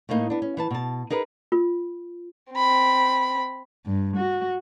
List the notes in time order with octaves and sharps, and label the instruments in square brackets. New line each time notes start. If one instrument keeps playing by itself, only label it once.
[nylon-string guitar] A2 A3 A#3 D#4
B3 D4
C#4
E3 B4 A5
B2 A5
D#4 G#4 A#4 B4
[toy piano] F4
[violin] C4 B5
[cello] G2
F#4